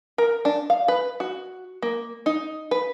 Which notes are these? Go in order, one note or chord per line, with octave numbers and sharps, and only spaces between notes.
A#4
D4
F5
B4
F#4
A#3
D#4
B4